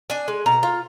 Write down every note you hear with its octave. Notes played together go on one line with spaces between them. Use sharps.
D4 G#5
G#3
B2 A#5
F4